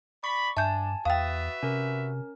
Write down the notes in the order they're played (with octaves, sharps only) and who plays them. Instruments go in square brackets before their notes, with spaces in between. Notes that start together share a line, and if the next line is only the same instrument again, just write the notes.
[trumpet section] D5 B5 [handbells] C#6
[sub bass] G2 [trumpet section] D4 [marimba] E5 G6 [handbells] G#5 A5
[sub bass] E2 [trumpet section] F#4 B4 E5 [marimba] F5 G5 [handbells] D#6 A6
[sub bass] C3 [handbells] C#4 A#4